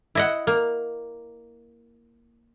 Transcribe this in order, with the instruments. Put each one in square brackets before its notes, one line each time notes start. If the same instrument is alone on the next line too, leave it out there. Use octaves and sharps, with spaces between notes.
[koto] E4 D#5 F#5
A#3